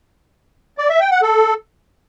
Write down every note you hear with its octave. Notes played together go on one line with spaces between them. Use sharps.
D5
E5
G5
F#5
A4